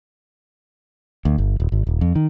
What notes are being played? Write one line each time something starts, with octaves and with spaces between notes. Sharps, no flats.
D2
G1
D#1
G#1
D#1
F2
D#3